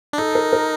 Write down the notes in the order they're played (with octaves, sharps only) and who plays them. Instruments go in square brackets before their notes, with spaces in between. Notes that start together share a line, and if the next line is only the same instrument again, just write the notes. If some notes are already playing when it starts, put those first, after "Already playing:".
[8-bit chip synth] D4
[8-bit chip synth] D#4 [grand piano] A4
[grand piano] A#4
A#4